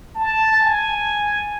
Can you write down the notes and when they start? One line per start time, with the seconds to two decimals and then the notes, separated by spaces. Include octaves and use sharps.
0.15 A5
0.60 G#5